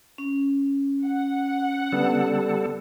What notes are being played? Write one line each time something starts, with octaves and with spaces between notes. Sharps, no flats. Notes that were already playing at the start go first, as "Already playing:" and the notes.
C#4
F#5
D3 G3 B3 A4